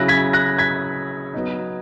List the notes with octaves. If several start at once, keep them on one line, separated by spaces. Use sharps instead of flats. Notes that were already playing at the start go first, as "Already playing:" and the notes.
Already playing: C#3 F#3 C#4 E4 F#6 A#6
G#6 B6
F#6 A#6
G#6 B6
F#3 B3 D#4